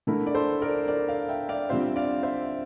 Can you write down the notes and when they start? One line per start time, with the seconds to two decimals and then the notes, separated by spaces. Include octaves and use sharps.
0.07 D3 A3 E4 A#4
0.27 D5
0.35 A4 C5
0.62 A#4 D5
0.88 A#4 D5
1.08 D5 F5
1.29 E5 G5
1.49 D5 F5
1.69 D3 G3 C4 F4 C5 E5
1.96 D5 F5
2.23 C5 E5